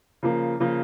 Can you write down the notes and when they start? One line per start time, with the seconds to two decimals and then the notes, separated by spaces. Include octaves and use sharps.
0.23 C#3 F3 A#3
0.60 C#3 F3 A#3